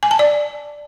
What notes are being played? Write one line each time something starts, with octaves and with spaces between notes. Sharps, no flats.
G#5
A5
D5